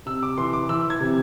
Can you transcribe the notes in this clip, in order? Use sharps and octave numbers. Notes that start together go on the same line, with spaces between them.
C3 E6
D6
E3 C6
D6
E3 E6
G#6
C3